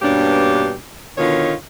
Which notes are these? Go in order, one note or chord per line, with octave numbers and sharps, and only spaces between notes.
G2 B2 A#3 C#4 D4 G4
B2 D3 D#3 D#4 F4 C#5